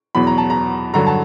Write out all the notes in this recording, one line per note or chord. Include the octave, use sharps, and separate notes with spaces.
E2 B2 F#3 B5
A#5
A5
A#5
G2 D3 F#3 A#5
A5